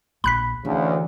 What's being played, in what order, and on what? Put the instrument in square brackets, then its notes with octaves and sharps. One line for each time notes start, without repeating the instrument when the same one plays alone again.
[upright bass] A#1 [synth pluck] B5 F#6 B6
[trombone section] D2 C#3 [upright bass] E3